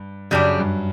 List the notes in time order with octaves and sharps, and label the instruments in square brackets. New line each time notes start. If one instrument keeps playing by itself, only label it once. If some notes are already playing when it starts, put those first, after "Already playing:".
Already playing: [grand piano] G2
[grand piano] F#2 [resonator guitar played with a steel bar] C#3 G3 D4
[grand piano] G2